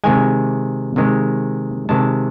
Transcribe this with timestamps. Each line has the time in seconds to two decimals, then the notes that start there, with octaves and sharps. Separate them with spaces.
0.04 C3 D#3 G#3 G#5
0.96 C3 D#3 G#3
1.89 C3 D#3 G#3 A5